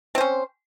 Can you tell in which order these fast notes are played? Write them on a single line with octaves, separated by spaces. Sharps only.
C4 C5 C#4